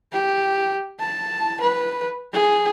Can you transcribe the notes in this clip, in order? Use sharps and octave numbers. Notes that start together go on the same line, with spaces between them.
G4
A5
B4
G#4